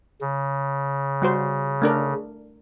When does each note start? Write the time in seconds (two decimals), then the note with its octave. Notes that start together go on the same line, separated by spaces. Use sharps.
0.21 C#3
1.22 G3 F#4 C5
1.82 A3 D4 A#4